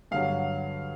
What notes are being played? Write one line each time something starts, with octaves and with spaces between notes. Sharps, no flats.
G2 D3 F#3 F5